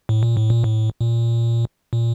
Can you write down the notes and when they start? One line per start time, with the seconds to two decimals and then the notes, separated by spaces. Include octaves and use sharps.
0.09 A2
0.23 A#2
0.37 A2
0.50 A#2
0.64 A2
1.01 A#2
1.93 A#2